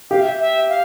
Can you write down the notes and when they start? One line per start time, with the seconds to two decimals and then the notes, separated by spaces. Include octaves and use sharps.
0.10 G4 F5
0.21 E5
0.40 E5
0.69 F5